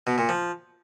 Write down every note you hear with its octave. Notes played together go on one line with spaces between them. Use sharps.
B2
A#2
F3